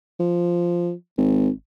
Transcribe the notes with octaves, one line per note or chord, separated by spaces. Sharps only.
F3
G#1